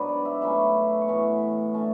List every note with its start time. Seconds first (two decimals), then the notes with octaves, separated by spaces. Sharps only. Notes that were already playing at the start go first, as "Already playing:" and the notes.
Already playing: G#2 F#3 B3 D4 B4
0.09 D5
0.25 E5
0.42 B2 F#3 A3 C#4 B5
1.01 C#6
1.08 A2 E3 B3 B5
1.74 D3 A3 C#4 A5